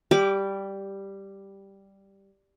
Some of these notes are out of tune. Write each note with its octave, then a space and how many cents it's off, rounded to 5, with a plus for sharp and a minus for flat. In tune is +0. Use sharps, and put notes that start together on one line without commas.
G3 +0 G4 +5 D6 -30